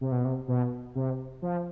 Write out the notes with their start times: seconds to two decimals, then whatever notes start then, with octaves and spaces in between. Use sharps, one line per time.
0.01 C3
0.12 B2
0.25 C3
0.48 B2
0.95 C3
1.42 F3